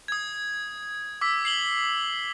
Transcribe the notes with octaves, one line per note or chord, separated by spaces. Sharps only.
D#6 G#6
D6 E6 B6
C7 F#7 G7